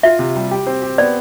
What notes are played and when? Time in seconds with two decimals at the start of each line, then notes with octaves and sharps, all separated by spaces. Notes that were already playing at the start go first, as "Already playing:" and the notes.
0.03 F4 E5
0.19 C3
0.36 G3
0.51 G4
0.66 C4
0.82 G4
0.98 B3 D5